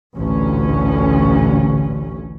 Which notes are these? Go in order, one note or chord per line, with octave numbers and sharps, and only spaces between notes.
A1 D2 A#2 D3 C#4